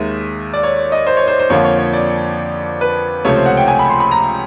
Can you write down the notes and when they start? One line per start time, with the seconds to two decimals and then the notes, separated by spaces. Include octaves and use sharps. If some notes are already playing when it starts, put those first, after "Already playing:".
Already playing: D#2 D#3 G#3 E5
0.54 D5
0.63 C#5
0.92 D#5
1.07 C5
1.17 C#5
1.28 C5
1.39 C5
1.50 F2 D3 F3 A#3 C#5
1.65 C#5
1.79 C#5
1.93 D5
2.81 B4
3.25 C#2 C3 F3 A3 C#5
3.36 C5
3.46 F#5
3.57 G5
3.68 G#5
3.79 B5
3.90 C6
4.00 B5
4.11 A#5